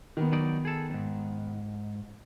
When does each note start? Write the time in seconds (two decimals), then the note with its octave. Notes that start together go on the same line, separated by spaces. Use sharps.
0.17 D#3 B3
0.32 F#3 D#4 D5
0.65 G#4 A4
0.90 E2 G#2